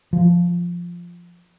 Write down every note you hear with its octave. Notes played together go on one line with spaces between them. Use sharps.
F3